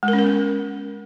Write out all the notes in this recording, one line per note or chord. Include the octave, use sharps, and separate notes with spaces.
G#3
A#4
C#4
A#4
B3